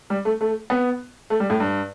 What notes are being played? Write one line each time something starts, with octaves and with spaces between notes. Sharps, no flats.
G3
A3
A3
B3
A3
G3
A2
G2